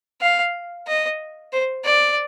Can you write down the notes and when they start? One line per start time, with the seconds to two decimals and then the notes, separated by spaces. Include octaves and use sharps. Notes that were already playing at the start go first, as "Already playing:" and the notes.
0.21 F5
0.87 D#5
1.53 C5
1.85 D5